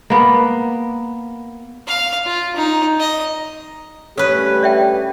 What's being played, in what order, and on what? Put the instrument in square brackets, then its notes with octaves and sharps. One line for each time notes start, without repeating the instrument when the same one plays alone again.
[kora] A#3 B3
[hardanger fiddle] F5
F4
D#4
D#5
[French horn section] G2 A3 G4 [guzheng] C#4 B4 [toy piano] A4
[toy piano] D5 E5 G5